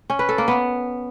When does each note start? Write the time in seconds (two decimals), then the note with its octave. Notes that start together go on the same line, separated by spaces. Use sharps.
0.10 C#4
0.19 B4
0.29 A4
0.38 A#3
0.48 B3